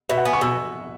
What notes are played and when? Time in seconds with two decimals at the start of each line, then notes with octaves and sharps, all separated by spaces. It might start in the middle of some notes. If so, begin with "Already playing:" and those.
0.09 B2 E5
0.18 F#5
0.25 B3 G#5
0.33 C#6
0.41 B2 E6